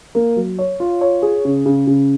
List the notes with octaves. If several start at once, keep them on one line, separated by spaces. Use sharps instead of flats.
A#3
F#3
C#5
F4
C#5
G#4
C#3
C#3
C#3